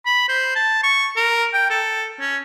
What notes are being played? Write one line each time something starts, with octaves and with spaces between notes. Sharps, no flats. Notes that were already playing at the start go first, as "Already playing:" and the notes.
B5
C5
A5
C#6
A#4
G5
A4
C#4